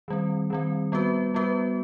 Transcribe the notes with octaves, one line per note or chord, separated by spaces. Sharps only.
D#3 G3 C4
D#3 G3 C4
G3 B3 F#4 B4
G3 B3 F#4 B4